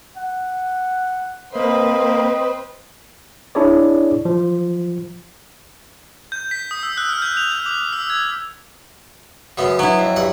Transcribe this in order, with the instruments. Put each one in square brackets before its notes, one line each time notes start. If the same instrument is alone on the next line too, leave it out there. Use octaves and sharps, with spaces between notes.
[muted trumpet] F#5
[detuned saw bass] A#3 [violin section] C4 B4 C5 [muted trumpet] D#5
[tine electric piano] D4 E4 G#4 C#5 D5
F3
[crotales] G6
B6
D#6
E6
F#6
F6
G6
F7
G6
D6
E6
G#6
[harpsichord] F#2 C#3 B3
[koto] F#3 E4 [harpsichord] B3
[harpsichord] F2
G2 F#5